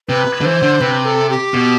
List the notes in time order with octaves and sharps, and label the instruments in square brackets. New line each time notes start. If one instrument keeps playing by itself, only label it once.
[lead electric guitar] C3 [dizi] B4
[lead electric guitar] D3
[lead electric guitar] E3 [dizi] C5
[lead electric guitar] D3
[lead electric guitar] C3 [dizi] B4
[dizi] A4
G4
[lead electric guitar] B2